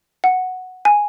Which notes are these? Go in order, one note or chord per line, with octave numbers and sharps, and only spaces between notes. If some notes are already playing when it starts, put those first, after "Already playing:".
F#5
G#5